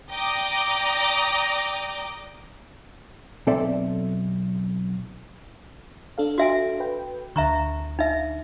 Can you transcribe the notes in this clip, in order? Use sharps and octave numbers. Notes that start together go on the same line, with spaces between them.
D5 G5 A#5 D6 D#6 A#6
B1 C4 A4 D5 E5
D4 A4 F5
F#4 E5 G#5
B4 G5
D2 D3 E5 A#5 C#6
D#4 E5